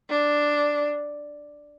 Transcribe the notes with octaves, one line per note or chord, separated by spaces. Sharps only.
D4